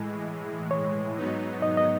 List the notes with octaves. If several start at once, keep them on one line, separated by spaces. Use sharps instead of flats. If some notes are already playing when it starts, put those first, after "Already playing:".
Already playing: A2 E3 G#3
C#5
G#2 F#3 B3 D#4
D#5
D#5